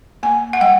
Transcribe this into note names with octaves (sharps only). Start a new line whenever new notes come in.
A#3 G#5
F#5
G3 G5